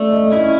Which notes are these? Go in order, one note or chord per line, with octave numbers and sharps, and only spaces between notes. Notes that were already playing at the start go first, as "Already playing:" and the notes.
Already playing: A3 D5
D#5
C#4 E4 D#5